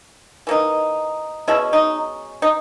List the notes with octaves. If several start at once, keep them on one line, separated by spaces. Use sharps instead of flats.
E3 A#3 D#4
B2 G#3 C#4 E4
D#4
D#4